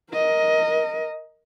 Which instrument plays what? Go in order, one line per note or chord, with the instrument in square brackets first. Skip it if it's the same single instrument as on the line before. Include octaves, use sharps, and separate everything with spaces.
[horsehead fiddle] A#4 D#5